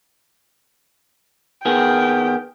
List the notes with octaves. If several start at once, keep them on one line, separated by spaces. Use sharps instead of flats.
D#3 B3 G#4 G5